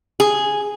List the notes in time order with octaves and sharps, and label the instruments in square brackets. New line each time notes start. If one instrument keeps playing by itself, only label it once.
[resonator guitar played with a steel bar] G#4